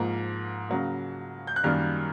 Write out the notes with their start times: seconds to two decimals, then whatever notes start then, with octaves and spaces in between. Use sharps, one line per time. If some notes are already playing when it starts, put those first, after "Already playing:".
Already playing: G#2 F3 A#3
0.69 C#3 F#3 A#3
1.47 G6
1.56 F#6
1.64 F#2 D#3 G3 A#3 F6